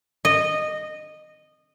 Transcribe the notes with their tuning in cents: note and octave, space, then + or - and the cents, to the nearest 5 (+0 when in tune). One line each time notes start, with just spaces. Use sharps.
D#5 -15